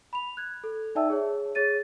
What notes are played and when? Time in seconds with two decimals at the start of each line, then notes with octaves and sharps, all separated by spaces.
0.13 B5 F7
0.37 F#6 G#6
0.64 A4
0.95 D#4 D5 E5 G5 A5 E6
1.10 G#4 C#5
1.55 G#4 C#5 A6 D#7